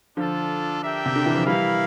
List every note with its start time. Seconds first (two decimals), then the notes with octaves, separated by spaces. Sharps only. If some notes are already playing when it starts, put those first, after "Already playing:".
0.17 D3 F3 D4 F4 A4
0.82 D4 G4 A#4 E5 G5
1.06 C3
1.16 D3
1.26 E3
1.36 F3
1.46 E3 G3 E4 A#4 F5